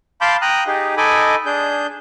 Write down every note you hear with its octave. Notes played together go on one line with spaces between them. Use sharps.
F5 A5 B5 C6 D6 G6
G5 A#5 D#6 F#6
D#4 G4 G#4
D#4 A4 D#5 G#5 B5 D6
D4 G#4 G6